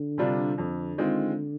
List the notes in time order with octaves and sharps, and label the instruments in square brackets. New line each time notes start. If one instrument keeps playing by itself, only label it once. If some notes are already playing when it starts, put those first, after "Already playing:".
Already playing: [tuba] D3
[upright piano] C3 G3 D4 F4
[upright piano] F2 [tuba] D3
[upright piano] D#3 G#3 C4 F4